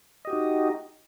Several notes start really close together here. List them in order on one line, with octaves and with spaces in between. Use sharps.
D#5 G4 F#4 D#4